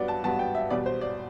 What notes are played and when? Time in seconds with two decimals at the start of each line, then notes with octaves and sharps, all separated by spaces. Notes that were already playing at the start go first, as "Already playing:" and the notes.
Already playing: G2 F#3 B3 D5
0.08 A5
0.24 G2 F#3 B3 A5
0.39 G5
0.55 E5
0.70 E2 B2 G3 D5
0.86 C5
1.01 D5